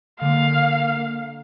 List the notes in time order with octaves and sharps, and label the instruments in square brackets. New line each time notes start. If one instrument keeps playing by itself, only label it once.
[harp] D3 G#3 D6 [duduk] A#3 [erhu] F5